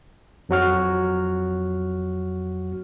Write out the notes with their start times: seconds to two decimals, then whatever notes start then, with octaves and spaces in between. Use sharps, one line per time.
0.49 F2 F#3 F#4 F6